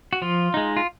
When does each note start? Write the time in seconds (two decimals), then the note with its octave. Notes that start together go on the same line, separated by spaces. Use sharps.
0.13 F#4
0.22 F3 F4
0.54 G#3 D#4
0.77 F4